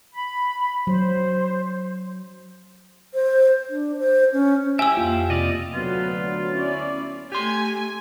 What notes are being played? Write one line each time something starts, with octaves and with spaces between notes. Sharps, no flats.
B5
F#3 C5
C5
D4
C5
C#4
E4 G4 E5 G#5 E6
F2 A#3 F4
C3 F4 D5 D#5
D2 D3 F#3 B3 F4 B4
C#4 E4 D5
A3 G4 G#5 C6